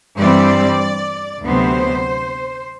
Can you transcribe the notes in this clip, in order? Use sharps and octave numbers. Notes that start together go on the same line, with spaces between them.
G2 E3 G3 C4 D5
D2 C3 F#3 B3 C5